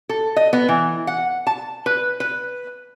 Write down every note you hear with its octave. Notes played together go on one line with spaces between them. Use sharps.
A4
D#5
B3
E3
F#5
A5
B4
B4